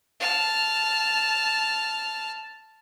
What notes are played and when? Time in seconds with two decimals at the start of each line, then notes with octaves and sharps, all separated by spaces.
0.20 A5 F6